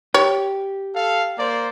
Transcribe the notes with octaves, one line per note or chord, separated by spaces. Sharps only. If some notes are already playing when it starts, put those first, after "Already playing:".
G4 C#5
A4 F5
A#3 C5 D5